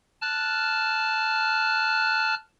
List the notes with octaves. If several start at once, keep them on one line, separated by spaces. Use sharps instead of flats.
A5 F6 F#6